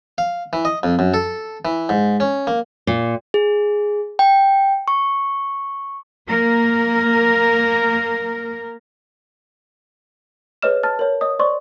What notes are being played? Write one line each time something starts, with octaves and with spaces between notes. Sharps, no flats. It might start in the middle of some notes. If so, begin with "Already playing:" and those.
F5
E3
D#5
F2
F#2
A4
E3
G#2
C#4
A#3
A#2
G#4
G5
C#6
A#3 A#4
G#4 B4 C#5 D#5 F6 E7
A5 F6 A6
A#4 C#5
C#5 D#5 D#6
C5 D5 C6 C#6